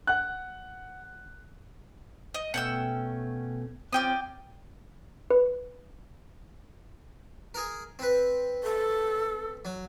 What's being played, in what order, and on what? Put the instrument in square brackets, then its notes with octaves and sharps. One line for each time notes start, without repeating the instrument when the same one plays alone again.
[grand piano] F#5 F#6
[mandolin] D#5
[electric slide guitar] B2 A3 C#4 [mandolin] F#5 G5 E6
[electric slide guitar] C4 C#4 F4 [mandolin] D5 G5 D#6
[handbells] B4
[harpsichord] G#4 A#4
C4 B4
[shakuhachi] A4
[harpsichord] F#3